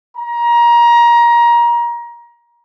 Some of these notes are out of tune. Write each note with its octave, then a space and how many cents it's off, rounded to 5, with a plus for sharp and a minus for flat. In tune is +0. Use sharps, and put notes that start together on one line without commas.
A#5 +25